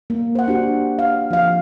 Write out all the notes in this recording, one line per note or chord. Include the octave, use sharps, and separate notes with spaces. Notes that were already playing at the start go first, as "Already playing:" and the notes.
A#3
C5 F#5
D4 F#4 G4
F5
F3 F5